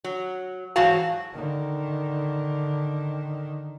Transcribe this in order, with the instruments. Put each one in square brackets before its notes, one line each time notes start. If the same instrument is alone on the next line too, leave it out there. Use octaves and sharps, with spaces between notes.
[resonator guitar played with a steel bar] F#3
G#2 E3 F#3 F#4 F5 A5
[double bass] D3 D#3